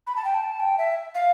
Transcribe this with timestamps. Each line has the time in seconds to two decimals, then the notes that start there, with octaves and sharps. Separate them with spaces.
0.07 B5
0.16 A5
0.24 G5
0.34 A5
0.60 G5
0.78 E5
1.15 F5